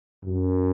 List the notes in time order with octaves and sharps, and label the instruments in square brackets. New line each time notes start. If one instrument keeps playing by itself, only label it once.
[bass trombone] F#2